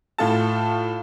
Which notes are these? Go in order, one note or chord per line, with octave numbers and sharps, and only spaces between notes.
A2 F4 A4 A5